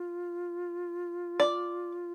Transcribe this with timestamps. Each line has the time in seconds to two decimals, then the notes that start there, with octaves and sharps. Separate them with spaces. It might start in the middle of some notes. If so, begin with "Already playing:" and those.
Already playing: F4
1.40 D5